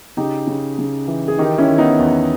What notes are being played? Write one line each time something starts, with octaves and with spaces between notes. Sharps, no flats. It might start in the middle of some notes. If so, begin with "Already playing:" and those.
C#3 D#4 G4
C#3
C#3
E3
G#4
D#3 D#4 G4
C#4 E4
D#3
B3 D#4
E2